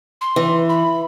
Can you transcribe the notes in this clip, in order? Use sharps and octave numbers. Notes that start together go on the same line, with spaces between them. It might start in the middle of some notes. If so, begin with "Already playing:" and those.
C6
E3
B5